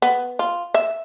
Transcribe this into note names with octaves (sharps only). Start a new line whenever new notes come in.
B3
F4
E5